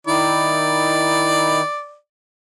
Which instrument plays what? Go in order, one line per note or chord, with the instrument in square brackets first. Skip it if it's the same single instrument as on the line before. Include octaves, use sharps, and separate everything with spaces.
[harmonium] D#3 D#4 E4 [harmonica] D5